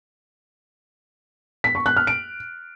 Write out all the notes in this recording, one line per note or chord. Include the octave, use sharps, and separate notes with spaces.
B6
C#6
F#6
F6
D7